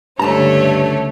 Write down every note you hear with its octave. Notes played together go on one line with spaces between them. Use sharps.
C#2 G2 D3 A3 C#5 A5 A#5